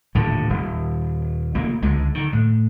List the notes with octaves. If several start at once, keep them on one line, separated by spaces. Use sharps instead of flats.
D#1 A2 D3
D#1
F1 C#3 A#3
C#2 D3 G#3
D3 D#3
A2